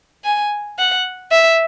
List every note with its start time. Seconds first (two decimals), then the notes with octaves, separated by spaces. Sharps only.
0.24 G#5
0.79 F#5
1.32 E5